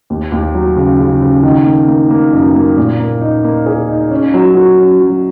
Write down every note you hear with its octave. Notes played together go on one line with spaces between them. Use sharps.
D#2
D#2
F#3
C#3
C#3
C#3
D#3
A#3
A#3
A#3
F#2
A#3
A#2
A#3
D#4
A#3
G#4
D#4
C#4
F#3
F#4
C#4
F#3